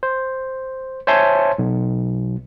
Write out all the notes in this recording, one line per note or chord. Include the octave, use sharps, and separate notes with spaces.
C5
C5 C#5 E5 G#5 A5 C6
B1